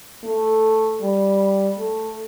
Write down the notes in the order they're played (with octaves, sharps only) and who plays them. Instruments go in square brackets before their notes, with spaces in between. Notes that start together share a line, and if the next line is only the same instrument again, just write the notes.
[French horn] A3
G3
A3